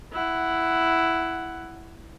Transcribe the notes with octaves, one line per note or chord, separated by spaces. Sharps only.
E4 F#5